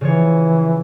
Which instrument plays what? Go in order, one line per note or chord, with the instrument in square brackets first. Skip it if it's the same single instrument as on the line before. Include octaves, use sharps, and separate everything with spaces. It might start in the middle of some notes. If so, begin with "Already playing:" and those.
[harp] C#3 F3 C#5 [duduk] E3